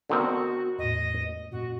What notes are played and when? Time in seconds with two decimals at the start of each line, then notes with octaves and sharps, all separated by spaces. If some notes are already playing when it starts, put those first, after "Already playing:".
0.10 D3 D#3 B3 C4 F#4 D#5
0.79 E2 A2 D#5
1.52 F#2 A#2 F#4